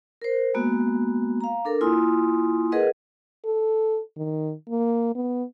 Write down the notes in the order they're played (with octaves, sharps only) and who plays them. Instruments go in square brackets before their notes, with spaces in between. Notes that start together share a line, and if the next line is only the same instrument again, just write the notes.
[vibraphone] A#4 C5
G#3 A#3 B3 F#4
F5 A#5
D4 A4 A#4
A#3 E4 F4 G#5 C6 D#6
G#4 A#4 B4 D#5 F#5
[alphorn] A4
D#3
A#3
B3